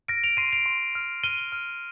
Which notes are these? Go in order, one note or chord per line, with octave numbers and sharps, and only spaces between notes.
F6 A#6 D7
D7 F7
C6 C7 D#7
D7 F7
C6
F6
F6 D#7 G7
F6